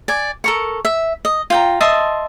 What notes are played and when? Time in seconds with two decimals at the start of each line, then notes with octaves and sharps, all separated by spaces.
0.08 D5 G#5
0.44 A4 A#4 C#6
0.85 E5
1.25 D#5
1.50 F4 G5 A#5
1.81 D#5 E5 A5 C6